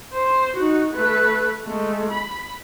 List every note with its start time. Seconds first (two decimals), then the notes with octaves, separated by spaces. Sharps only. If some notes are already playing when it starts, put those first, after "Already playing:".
0.14 C5
0.57 D#4 F#4
0.94 A3 B4
1.65 G#3 A3
2.11 B5